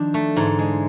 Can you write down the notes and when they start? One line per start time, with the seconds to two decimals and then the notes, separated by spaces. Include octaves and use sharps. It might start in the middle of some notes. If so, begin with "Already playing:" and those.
Already playing: D#3 F3 D4
0.14 A3
0.36 G#2 D3 E3
0.59 G#3